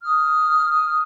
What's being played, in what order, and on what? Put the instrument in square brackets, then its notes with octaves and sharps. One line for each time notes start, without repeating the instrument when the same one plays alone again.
[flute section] D#6 F6